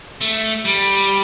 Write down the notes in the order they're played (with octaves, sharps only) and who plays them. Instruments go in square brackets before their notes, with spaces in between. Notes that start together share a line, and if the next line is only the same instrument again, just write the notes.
[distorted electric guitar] A3
G3